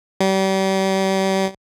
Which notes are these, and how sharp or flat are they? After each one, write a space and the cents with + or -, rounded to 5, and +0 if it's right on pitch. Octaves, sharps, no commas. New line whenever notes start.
G3 -35